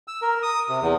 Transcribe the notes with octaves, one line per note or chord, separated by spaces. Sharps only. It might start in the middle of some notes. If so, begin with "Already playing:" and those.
E6
A#4
D#6
C3
E2